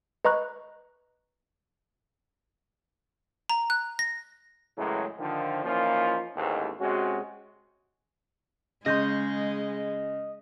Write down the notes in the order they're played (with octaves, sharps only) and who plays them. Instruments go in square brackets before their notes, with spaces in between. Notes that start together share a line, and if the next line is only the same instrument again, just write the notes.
[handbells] B4 D#5 A#5 C#6 F#6
[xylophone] A#5
F#6
A#6
[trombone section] F#2 A2 C#3 E3 F#3 G#3
D3 D#3 F3
E3 F3 A#3 C#4 D#4 F4
A1 D#2 G#2
C3 G#3 C#4 F#4
[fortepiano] C#3 [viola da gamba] G#3 [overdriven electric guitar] D#5 [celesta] C6 G6 A#6